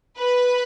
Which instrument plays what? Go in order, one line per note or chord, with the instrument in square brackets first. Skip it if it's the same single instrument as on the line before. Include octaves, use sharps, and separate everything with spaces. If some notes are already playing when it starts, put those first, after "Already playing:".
[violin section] B4